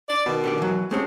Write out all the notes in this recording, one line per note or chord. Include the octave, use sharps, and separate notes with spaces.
D5
B2 D#3
D3 G4 D5
E3 F#3
F#2 G#3 A3 C4 C#4 G4